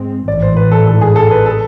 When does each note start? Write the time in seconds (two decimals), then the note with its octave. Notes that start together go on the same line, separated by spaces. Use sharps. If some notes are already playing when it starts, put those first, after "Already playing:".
Already playing: G#2 G#3 C4
0.27 A1 G#2 E3 D5
0.42 C5
0.57 B4
0.72 A4
0.87 A4
1.01 G#4
1.16 A4
1.31 B4
1.46 A4